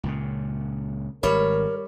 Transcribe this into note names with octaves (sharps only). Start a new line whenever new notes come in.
C#2 A#2 C#3
G#1 G3 A#4 C#5